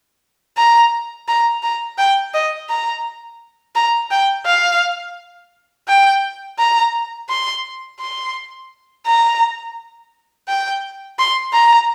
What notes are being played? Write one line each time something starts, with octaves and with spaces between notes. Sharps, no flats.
A#5
A#5
A#5
G5
D#5
A#5
A#5
G5
F5
G5
A#5
C6
C6
A#5
G5
C6
A#5